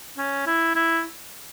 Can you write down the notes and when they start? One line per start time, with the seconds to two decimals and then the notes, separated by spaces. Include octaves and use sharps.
0.18 C#4
0.47 E4
0.75 E4